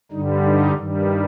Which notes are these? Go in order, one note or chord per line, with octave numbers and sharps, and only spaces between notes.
G2 D3 G3 D#4
D#4
G2 D#3 G3